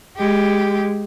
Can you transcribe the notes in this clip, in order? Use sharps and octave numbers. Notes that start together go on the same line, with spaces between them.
G#3 G4